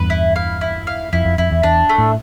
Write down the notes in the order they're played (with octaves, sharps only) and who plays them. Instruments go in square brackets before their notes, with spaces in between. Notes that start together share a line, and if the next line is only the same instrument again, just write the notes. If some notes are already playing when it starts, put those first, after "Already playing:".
Already playing: [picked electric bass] E2 G2 [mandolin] B4
[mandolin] E4
F5
E4
F5
[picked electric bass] F2 [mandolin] E4
[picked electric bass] F2
[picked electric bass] F2 [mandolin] E4
[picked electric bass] E2
[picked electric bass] E2 [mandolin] D4
[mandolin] A3
[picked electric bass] A2